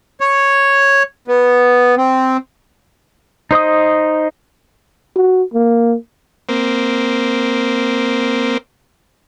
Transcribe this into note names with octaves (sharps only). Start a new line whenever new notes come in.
C#5
B3
C4
D#4 C5 D#5 D#6
F#4
A#3
A#3 C4